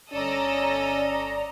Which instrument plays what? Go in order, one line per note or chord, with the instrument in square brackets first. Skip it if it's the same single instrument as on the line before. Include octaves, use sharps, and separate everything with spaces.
[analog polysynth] G1 D5 A#5 [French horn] C#4 [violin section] A4 D#5